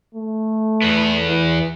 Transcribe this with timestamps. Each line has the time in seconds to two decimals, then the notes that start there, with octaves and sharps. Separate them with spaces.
0.14 A3
0.82 E2 B3
1.28 E3